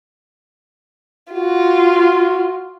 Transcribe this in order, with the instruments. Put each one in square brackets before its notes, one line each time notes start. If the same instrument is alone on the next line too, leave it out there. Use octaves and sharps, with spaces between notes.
[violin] F4 [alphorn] F#4